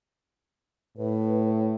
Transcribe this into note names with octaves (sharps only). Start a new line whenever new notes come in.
A2 B4